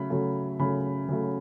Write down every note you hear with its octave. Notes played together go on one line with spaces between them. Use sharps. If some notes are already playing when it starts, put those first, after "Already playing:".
Already playing: C#3 F#3 A3 B5
C#3 F#3 A3
C#3 F#3 A3 B5
C#3 F#3 A3